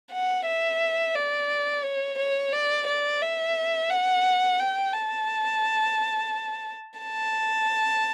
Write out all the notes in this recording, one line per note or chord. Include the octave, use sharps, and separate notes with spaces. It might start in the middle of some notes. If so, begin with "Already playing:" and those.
F#5
E5
D5
C#5
C#5
D5
D5
E5
F#5
G5
A5
A5